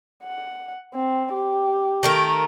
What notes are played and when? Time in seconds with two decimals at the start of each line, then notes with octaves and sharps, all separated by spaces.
0.24 F#5
0.94 C4
1.33 G4
2.03 D#3 A3 A#4